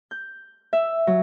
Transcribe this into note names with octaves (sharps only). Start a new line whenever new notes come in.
G6
E5
F#3